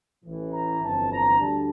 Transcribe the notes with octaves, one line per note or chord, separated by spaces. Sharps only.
A1 A2 E3
A#5
G1 F2 E3 A5
A#5
D2 D3 G3 A5